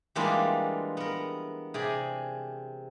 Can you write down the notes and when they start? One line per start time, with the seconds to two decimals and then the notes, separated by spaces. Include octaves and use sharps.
0.15 E3 G3 G#3 A#3 D4 F4
0.97 B3 A#4
1.74 C3 G#4 D5